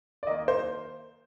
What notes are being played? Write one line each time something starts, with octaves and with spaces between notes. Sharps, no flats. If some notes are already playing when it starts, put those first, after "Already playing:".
D5
D#3 A#3 D#5
C5